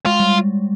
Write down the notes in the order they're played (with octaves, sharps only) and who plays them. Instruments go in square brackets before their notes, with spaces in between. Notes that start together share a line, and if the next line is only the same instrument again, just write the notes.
[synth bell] G#3 [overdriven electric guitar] F4
[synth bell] G3